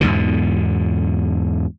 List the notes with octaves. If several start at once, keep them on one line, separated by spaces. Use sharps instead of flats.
E2 G#2 B2 D3